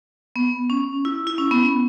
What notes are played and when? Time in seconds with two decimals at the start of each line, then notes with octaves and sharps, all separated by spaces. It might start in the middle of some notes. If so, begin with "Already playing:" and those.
0.36 B3
0.70 C#4
1.05 E4
1.27 E4
1.38 C#4
1.51 B3